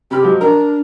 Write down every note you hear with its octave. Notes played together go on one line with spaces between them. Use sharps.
C3 G4 B5 F6
F3 F#3 G#3
D4 A#4